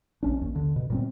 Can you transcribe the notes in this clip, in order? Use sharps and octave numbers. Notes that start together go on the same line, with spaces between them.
A#1 C#4 D4
D#2
D3
B2
A#2 G3 C4